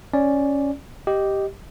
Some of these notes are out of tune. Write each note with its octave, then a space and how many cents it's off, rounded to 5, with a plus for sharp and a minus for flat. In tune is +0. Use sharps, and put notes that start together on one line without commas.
C#4 +0 D5 +0
G4 -5 D#5 +0